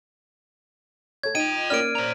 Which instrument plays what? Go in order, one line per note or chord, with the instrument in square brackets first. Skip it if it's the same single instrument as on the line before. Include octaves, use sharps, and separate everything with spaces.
[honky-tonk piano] A4 C#5 [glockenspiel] G#6
[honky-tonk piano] D#4 [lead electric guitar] F4 G5 [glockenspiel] D#7
[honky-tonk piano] A#3 C#4 D5 [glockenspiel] F6 D7
[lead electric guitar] C5 A#5